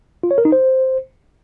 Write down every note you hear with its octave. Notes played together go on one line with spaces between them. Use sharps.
F4
C#5
A#4
D#4
C5